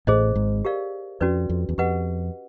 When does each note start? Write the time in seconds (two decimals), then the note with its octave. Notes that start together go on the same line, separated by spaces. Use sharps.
0.07 A1 A2 G#4 C5 D#5
0.35 G#1 G#2
0.65 G4 A#4 D5 F5
1.20 F2 C#4 F#4 B4 D5
1.49 F2
1.69 E2
1.78 F2 G4 B4 D#5 F#5